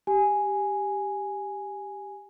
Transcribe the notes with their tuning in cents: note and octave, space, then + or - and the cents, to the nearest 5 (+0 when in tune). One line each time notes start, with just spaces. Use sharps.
G4 +0 G#5 +0